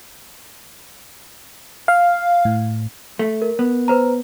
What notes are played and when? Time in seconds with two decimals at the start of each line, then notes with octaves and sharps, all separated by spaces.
1.88 F5
2.45 A2
3.19 A3
3.42 A#4
3.59 B3
3.88 B4 C5 A#5